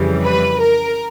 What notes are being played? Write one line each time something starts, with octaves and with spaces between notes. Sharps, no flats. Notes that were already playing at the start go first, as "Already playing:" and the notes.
Already playing: F2 C#3 E3 G3
B4
A#4